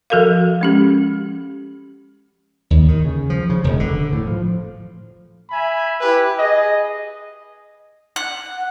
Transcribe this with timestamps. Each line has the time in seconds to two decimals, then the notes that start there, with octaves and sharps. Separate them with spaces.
0.10 F3 F#4 A4 A#4 F5
0.61 G#3 C#4 G4
2.70 D#2
2.88 D#3
3.05 C#3
3.30 F3
3.50 C#3
3.64 E1
3.80 D3
4.13 A2
4.27 F3
5.50 E5 G#5 B5
6.01 E4 G4 B4
6.38 G#4 D#5
8.16 F#5